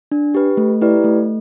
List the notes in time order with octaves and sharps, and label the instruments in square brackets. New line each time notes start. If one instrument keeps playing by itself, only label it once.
[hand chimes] D4
G4 B4
A3
E4 G4 B4 D5
A3